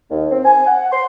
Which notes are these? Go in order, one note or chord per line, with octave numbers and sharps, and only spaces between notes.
D#2
C4
G#5
F#5
C6